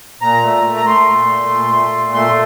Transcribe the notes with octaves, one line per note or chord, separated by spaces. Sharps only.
A#2 A#5
A3
A3
A#5
A3 C6
A#2
A3
A#2
A3
A#2
A3 C6